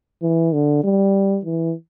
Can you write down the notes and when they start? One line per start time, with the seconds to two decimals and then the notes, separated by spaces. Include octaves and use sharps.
0.23 E3
0.53 D3
0.84 G3
1.45 E3